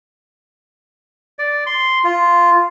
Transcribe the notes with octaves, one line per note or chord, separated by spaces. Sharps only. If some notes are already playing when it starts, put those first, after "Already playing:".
D5
C6
F4